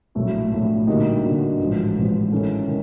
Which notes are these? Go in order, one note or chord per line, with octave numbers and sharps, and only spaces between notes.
A#1 A2 F#3 A3
A#1 A2 F#3 A3
D3 G3 A#3 D#4 F#4
D3 G3 A#3 D#4 F#4
A1 G#2 F3
A1 G#2 F3
D#3 G#3 C#4 E4 A4
D#3